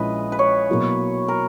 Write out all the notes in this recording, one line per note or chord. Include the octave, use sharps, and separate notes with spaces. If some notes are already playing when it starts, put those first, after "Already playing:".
Already playing: A#1 A#2 G#3 C#4 E4 B4 D#5
B4
C#5
B2 F#3 A#3 E4
A#4